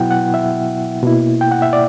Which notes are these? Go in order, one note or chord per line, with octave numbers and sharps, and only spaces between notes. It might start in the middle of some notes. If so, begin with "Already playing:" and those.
Already playing: B2 F#3 B3 E4 F#5 G5
F#5
E5
B2 A#3 E4
G5
F#5
E5
D5